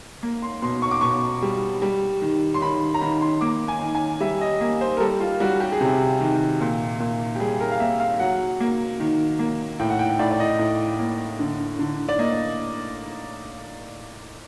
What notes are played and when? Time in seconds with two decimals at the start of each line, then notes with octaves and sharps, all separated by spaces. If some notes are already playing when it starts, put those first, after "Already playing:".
0.23 A#3
0.42 C6
0.62 B2 C6
0.82 C#6
0.91 D6
1.01 B2 C#6
1.42 G3
1.82 G3
2.22 D#3
2.54 C6
2.61 D#3 B5
2.94 A#5
3.01 D#3 B5
3.21 C6
3.41 A#3 D6
3.68 G#5
3.81 D#3
3.95 G#5
4.21 G3 E5
4.41 D#5
4.61 A#3
4.81 C5
4.97 A#4
5.00 G3 A4
5.20 F4
5.40 G3 F#4
5.60 G4
5.72 G#4
5.81 C3 G4
6.20 D#3
6.61 A#2
7.00 A#2
7.36 G4
7.40 G3 G#4
7.60 A#4
7.72 F5
7.80 A#3 E5
8.00 F5
8.20 F#3 F#5
8.60 A#3
9.00 D#3
9.39 A#3
9.80 A2 G5
9.90 F#5
9.99 G5
10.19 A2 D5
10.31 D5
10.40 D#5
10.59 A2
10.99 A#3
11.39 D3
11.79 D3
12.09 D5
12.19 A#3 D#5